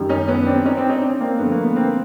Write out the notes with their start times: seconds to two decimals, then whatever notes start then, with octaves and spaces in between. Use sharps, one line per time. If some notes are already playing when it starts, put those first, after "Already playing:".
Already playing: F#2 D#3 G3
0.09 C#4 D#4
0.28 B3 C#4
0.47 C4 D4
0.65 C#4 D#4
0.77 C4 D4
0.90 C#4 D#4
1.02 C4 D4
1.21 A#3 C4
1.39 G2 D3 F3 A3 B3
1.52 A#3
1.64 B3
1.76 A#3 C4